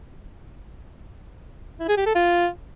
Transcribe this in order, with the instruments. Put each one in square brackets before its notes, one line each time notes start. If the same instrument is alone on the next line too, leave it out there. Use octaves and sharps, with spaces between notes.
[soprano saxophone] E4
G#4
G4
A4
F4